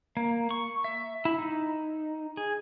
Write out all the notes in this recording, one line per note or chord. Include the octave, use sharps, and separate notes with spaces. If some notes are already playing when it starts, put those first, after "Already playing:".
A#3
C#6
E5
E4
D#4
G#4